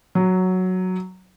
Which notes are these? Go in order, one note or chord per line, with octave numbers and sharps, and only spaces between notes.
F#3